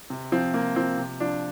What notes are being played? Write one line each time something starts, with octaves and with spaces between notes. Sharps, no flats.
C3
F3 C4
C3 A#3
F3 C4
C3
F3 D4